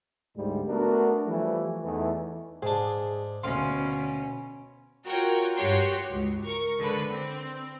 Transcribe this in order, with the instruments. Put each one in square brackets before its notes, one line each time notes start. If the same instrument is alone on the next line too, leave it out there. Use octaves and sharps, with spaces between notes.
[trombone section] D2 G#2 G3 A3
A3 B3 D4 F#4 A#4
E3 F3 G3 A3 E4
E2 E3 A3 D#4
[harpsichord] G#2 D4 [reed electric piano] G#4 A5
[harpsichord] D2 F5 [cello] B2 C#4 [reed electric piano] C6
[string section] F4 F#4 A#4 C#5 G5 A#5
G2 F#4 G4 C#5 C6
C#2
A#4 C#6
D3 G#3 B4
C4